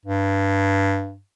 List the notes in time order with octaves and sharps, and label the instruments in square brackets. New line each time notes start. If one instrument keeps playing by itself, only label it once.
[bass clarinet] G2